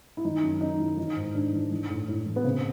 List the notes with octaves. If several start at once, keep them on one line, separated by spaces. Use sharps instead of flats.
E4
D#3 D#4
F#2
F#2 D#4
D#3 E4
E3 D#4
G#2
G#2 D4
E3
E3
A2
A2
E3
B3
C#3 C4